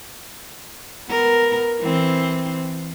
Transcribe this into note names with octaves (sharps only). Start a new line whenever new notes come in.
B3 A#4
E3 C4